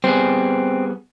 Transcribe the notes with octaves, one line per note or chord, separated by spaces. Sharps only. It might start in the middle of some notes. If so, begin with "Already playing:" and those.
G3 B3 C4 G#4